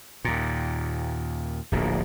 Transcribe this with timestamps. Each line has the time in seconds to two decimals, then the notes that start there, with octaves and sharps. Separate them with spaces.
0.25 D#2 A#2
1.72 D1 A#1 A#2